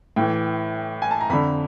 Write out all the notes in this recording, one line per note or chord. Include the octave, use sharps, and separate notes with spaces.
A2 E3 G5
G#5
A5
A#5
F2 D3 B5